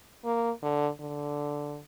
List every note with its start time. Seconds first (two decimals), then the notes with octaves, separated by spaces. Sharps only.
0.25 A#3
0.63 D3
1.00 D3